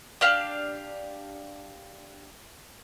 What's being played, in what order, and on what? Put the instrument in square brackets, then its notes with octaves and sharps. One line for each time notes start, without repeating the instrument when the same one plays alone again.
[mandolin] D4 G4 F5